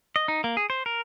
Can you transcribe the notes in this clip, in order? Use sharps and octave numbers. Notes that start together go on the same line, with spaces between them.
D#5
D#4
A#3
G#4
C5
A#4